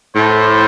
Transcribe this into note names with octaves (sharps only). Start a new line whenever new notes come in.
A2 C5